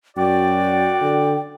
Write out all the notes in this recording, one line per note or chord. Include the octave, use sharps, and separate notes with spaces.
F#2 F#4 D5 G5
D3